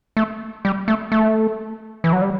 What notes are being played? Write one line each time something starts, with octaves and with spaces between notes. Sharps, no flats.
A3
G3
A3
A3
E3
F#3
G3